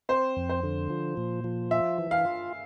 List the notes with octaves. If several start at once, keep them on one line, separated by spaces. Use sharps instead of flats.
C4 C5
F2
C5
D3
F3
A#2
F3
F4 E5
E3
F5
F4